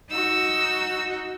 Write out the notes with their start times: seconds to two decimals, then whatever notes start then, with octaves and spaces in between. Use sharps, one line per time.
0.11 D#4 F#4 E6